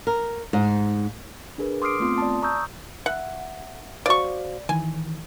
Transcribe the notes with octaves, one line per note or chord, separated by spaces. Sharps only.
A#4
G#2
D4 G#4 A#4 B4
C6 D6 D#6 F6 C7 D7
A3 B3 C4 F4 C6 D#6
D5 A5
A#5 C#6 D#6 E6 G6
E5 F#5
F#4 C5 D5 F5 C#6
D#3 E3 G#5